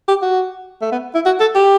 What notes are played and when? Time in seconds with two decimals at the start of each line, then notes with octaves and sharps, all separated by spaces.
0.08 G4
0.22 F#4
0.82 A3
0.92 B3
1.15 E4
1.26 F#4
1.40 A4
1.55 G4